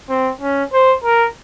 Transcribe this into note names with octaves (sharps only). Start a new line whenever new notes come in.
C4
C#4
C5
A#4